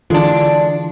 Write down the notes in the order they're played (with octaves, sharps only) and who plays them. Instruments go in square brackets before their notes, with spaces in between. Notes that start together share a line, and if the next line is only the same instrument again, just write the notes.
[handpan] D3 E3 F4 [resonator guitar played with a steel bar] G#3 D4